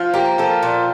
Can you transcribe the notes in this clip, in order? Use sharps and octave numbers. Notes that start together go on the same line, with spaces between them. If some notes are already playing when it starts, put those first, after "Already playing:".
Already playing: F3 F4
A#3 G4
F3 A4
A#2